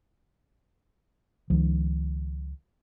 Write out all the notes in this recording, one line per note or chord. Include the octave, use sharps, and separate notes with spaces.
C#2 D#3 F3